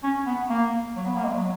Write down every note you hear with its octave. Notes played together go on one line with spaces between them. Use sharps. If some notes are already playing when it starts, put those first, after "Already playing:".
C#4
B3
A#3
F#3
B3
A#3
G#3
F#3